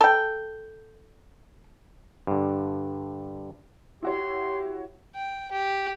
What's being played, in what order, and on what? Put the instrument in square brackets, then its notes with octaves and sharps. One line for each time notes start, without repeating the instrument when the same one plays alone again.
[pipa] A4 G5
[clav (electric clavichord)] G2 D3
[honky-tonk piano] E4 F#4 C#5 [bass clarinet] G4 [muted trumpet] C6
[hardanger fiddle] G5
G4